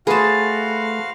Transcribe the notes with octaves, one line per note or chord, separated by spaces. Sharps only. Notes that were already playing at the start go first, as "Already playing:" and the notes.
A3 F#4 G#4 B4 C5 F5 A5